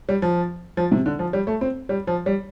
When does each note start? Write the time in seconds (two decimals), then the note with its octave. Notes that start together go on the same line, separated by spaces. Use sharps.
0.09 G3
0.22 F3
0.77 F3
0.92 C3
1.06 D3
1.19 F3
1.33 G3
1.47 A3
1.61 C4
1.89 G3
2.07 F3
2.26 G3